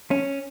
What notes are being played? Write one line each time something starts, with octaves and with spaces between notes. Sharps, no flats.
C#4